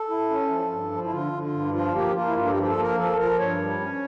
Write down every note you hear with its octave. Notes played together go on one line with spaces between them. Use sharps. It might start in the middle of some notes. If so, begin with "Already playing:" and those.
Already playing: A4
E4
C#4
F3
G2
F3
E4
D3 F4
D3
F4
G2
F3 F4
A#3 G4
A#3 F4
E4
G2 F4
A4
G4
F3
G4
A4
A#3 A#4
F3 A4
F3 A#4
G2 C#5
G3
C#4